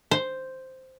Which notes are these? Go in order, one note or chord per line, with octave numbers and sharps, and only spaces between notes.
C5